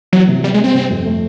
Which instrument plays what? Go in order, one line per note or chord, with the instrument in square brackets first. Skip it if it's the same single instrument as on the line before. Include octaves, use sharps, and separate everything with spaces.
[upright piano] E3 [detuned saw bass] F#3
[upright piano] C3
[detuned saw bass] G3 [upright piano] B3
[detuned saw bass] G#3
[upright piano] G3 [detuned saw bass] C4
[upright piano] C3
F2
A3